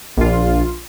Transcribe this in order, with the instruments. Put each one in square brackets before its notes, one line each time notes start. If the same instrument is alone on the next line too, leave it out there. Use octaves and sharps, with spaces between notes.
[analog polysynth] A#1 F4